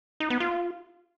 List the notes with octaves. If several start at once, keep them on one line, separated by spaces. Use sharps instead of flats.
D#4
B3
F4